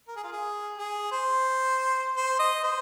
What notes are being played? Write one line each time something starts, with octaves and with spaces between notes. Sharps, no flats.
A#4
G#4
F4
G#4
G#4
C5
C5
D#5
C5